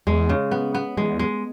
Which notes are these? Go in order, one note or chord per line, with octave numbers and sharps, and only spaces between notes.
E2 G#3
C#3
B3
B3
E2 G#3
G#3